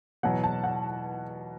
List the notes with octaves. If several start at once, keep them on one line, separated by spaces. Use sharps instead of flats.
E2 B2 F#3 F#5
A5
F#5